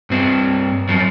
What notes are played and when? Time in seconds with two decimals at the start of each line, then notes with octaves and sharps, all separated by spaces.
0.10 G2 C4
0.89 F#2 F3